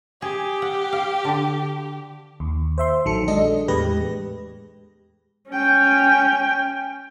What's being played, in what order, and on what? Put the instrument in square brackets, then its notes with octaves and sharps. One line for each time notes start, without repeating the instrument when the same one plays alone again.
[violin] G4 [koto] G#4
[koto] F#5
F5
D3
[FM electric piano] D#2
C5 E5 C6
A#1 D#3 F#3 A4 C#7
G#3 D4 A4 D#5
E2 A2 G#3 G4 B4 A#6
[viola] C#4 G5